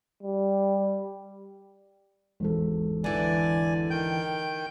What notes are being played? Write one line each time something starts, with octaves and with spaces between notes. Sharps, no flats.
G3
G#1 E2 A4
D3 E3 D5 G#5
D#3 G5 G6